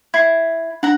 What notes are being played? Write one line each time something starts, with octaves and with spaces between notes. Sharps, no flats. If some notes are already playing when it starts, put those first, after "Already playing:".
E4 G#6 C7
D4 F#5 A#5